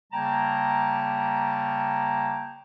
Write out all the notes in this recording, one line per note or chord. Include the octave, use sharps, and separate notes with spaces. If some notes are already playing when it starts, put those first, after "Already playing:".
C#3 G3 A#3 G5 A5 A#5